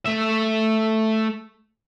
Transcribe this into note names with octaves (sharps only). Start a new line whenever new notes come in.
A3 E5